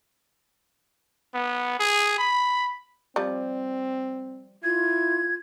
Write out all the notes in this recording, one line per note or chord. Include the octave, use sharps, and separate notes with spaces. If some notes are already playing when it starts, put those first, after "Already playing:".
B3
G#4
B5
F3 G3 C4
E4 F4 G#6